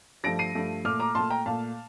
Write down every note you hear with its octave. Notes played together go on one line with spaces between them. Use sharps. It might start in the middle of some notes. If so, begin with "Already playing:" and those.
G2 F3 A3 A#6 D7
C7 D#7
G2 F3 A3
A#2 A3 D6 F6
A#5 D6
A#2 A3 A5 C6
G5 A#5
A#2 A3 F5 A5